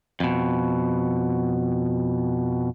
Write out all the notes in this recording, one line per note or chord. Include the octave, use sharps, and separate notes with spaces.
F2 B2